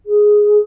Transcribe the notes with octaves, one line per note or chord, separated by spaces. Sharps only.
G#4